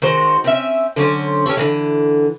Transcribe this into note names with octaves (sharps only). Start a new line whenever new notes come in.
D#3 G#3 F#4 C5
C4 C#4 E5
D3 F#3 C#4 C5
C#4 G4 A4 C#5
D3 E3 G#3